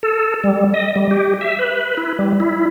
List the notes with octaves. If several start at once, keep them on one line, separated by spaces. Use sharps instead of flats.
A4
G3
D#5
G3
G4
E5
B4
E4
G3
E4